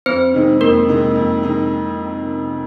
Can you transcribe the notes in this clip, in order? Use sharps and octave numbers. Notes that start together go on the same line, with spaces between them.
F2 C4 C5
C3 D#3 G#3 D#4
F2 A#3 A#4
C3 D#3 G#3 D#4
F2
C3 D#3 G#3 D#4